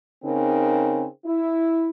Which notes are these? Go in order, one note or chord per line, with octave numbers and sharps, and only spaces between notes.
C#3 C4 D#4 A#4
E4